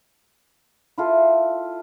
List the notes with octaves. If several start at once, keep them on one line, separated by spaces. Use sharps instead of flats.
E4 F4 A4